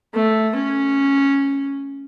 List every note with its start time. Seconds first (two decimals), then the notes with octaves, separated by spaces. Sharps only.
0.15 A3
0.56 C#4